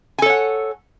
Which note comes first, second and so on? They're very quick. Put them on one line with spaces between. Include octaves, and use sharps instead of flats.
G#5 A4 C#5 F#5